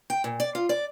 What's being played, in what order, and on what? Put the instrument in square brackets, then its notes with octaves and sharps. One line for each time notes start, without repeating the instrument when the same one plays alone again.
[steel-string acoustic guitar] G5
A#2
D5
F4
D5